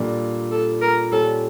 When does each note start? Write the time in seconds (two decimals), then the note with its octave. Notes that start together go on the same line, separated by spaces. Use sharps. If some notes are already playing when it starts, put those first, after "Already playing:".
Already playing: A#2 G3 D4 A4
0.51 A4
0.81 A#4
1.12 A#2 G3 C#4 G4 A4